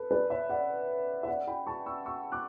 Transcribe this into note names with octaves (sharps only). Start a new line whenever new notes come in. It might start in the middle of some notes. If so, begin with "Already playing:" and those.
Already playing: A4 B4
B4 D5
C#5 E5
D5 F#5
E5
D5 F#5
G5 B5
A5 C#6
C#6 E6
C#6 E6
D6 F#6